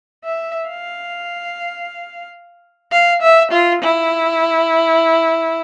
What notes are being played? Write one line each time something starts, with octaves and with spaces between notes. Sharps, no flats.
E5
F5
F5
E5
F4
E4